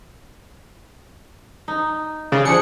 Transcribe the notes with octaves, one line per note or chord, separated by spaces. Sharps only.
D#4
C#3 D5
F3 D4 G#4 C#7